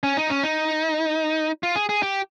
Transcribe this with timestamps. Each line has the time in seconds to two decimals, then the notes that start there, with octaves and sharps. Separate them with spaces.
0.03 C#4
0.17 D#4
0.30 C#4
0.43 D#4
1.63 F4
1.76 G#4
1.89 G#4
2.03 G4